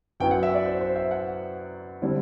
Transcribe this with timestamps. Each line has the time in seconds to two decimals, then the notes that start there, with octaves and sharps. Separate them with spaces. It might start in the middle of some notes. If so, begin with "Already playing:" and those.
0.20 F#2 F#3 B3 E4 G5
0.31 F#5
0.43 E5
0.54 D5
0.65 C5
0.81 C5
0.96 E5
1.11 F#5
2.02 D3 G3 C4 E4